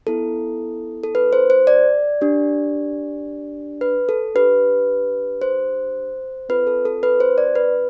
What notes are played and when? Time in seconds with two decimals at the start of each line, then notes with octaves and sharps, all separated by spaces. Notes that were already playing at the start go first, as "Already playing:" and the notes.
0.07 B3 E4 A4
1.04 A4
1.15 B4
1.33 C5
1.50 C5
1.67 D5
2.21 D4 G4
3.81 B4
4.09 A4
4.35 D4 G4 B4
5.42 C5
6.49 C4 F4 A4 B4
6.67 A4
6.85 A4
7.03 B4
7.20 C5
7.38 D5
7.55 B4